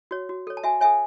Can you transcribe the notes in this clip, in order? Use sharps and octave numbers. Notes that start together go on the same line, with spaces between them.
F#4 C#5
F#4
A4 C#5
A5
F#4 E5 G#5
A4 C#5 E5 G#5